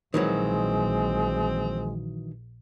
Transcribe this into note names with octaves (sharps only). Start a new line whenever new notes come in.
A#1 D#3 E3 F#3 G#3 C4